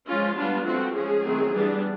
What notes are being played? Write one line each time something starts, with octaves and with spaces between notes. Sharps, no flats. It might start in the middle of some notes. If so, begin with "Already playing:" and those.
F3 G#3 C#4 F4
G3 B3 D4 F4
F3 A3 C4 F#4
F3 G#3 C#4 G#4
D#3 F#3 A3 C4
E3 G3 B3 D4